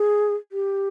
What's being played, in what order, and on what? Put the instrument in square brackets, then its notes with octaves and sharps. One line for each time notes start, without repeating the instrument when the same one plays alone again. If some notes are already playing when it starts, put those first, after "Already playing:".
Already playing: [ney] G#4
G4